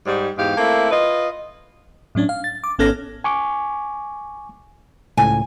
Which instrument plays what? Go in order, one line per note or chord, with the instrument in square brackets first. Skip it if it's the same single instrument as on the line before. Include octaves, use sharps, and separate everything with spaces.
[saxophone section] G#2 G3
E2 G#2 G4 F5
A3 A#3 C4 E4
F4 B4 D#5
[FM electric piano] A2 F#3 C#4 D4
F5
A6
D6
G#1 B3 C#4 A4 F6 A#6
[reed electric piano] G#5 C#6 D6
[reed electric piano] C#2 A2 [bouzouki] G#5